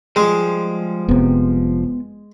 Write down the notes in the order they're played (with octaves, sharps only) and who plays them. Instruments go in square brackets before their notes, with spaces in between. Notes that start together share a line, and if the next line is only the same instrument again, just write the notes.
[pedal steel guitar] F3 G3 [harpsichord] G#3
[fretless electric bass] F1 C3 [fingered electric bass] B3